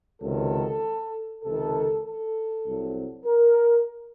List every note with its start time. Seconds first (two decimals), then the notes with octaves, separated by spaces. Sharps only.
0.22 C#2 C3 D#3 F#3 A4
1.44 C#2 C3 D#3 A4
2.04 A4
2.64 C2 C3 F#3
3.25 A#4